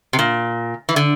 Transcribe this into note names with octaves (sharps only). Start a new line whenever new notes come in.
C3
A#2
E3
D3